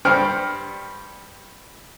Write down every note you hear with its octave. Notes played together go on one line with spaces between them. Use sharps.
G2 G3 C5 G5 F6